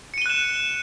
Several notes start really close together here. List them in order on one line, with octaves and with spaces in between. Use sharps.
C#7 D#7 G7 F#6 E7